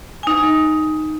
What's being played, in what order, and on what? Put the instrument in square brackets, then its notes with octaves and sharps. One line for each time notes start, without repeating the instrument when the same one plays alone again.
[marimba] D#4 G#5